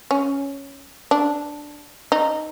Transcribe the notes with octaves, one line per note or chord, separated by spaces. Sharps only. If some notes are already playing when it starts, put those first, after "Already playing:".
C#4
D4
D#4